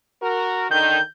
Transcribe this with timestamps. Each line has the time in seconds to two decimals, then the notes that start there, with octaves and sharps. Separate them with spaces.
0.22 F#4 A#4
0.71 D3 D#3 G6